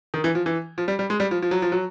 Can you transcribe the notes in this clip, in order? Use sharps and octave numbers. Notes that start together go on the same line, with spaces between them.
D#3
E3
F3
E3
F3
G3
G3
G#3
G3
F3
F3
F#3
F3
F#3